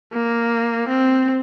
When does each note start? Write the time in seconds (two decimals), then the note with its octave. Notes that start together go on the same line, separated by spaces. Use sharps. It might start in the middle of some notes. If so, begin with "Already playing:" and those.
0.13 A#3
0.89 C4